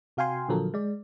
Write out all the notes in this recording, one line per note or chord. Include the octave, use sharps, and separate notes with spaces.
C3 F#4 F5 G5 G#5 C6
A#2 D3 F3 F#3 A4 A#4
G#3 D5